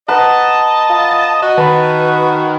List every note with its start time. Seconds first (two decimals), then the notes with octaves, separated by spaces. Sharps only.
0.08 B4 D#5 F#5 A5 A#5
0.90 F4
1.42 F#4 D#5
1.58 D#3 B4 A5 B5